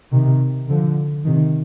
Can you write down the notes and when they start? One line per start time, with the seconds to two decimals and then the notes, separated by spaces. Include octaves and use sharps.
0.12 C3 D#3
0.68 D3 F3
1.26 C3 D#3